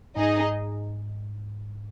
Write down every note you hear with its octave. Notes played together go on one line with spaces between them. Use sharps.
G#2 D#4 G#4 D#5